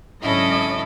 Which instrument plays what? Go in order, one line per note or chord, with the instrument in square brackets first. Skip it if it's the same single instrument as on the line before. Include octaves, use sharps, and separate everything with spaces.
[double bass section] G#1 C#3 F#3 [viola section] C#4 D4 D#5 [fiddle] E4 A4